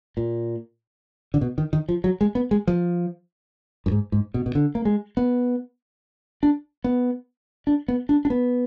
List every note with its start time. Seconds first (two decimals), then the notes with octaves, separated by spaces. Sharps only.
0.17 A#2
1.34 D3
1.41 B2
1.58 D#3
1.73 D#3
1.89 F3
2.04 F#3
2.21 G#3
2.35 B3
2.51 G#3
2.67 F3
3.86 F#2
3.91 G#2
4.12 G#2
4.34 B2
4.46 B2
4.55 D3
4.75 A#3
4.85 G#3
5.17 B3
6.43 D4
6.84 B3
7.67 D4
7.88 B3
8.09 D4
8.25 D4
8.30 B3